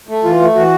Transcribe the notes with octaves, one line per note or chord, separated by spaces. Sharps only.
A3
E3 F4
A3
E3 F#4